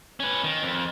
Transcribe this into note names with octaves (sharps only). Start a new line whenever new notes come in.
C#4 B4
D#3
F2